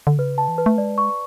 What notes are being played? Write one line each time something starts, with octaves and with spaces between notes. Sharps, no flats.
D3
C#3 B4
A5
E3
B4
A3
G#3 D5
C#6